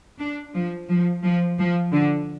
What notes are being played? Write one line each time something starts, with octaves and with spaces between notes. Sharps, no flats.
D4
F3
F3
F3
F3
D3